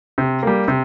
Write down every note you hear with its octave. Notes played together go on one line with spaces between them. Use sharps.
C3
G3 A#3
C3